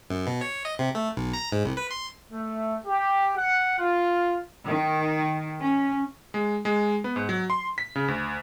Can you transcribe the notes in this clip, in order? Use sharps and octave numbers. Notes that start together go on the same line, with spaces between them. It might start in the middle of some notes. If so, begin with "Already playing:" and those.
F#2
B2
C#5
D#5
C3
A3
B1
A#5
G#2
C2
B4
C6
A3
G4
F#5
F4
D#3
C#4
G#3
G#3
B3
G#2
F#3
C6
B6
C#3
D2